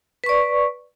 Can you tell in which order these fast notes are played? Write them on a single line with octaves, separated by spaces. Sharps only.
B4 C#6 D5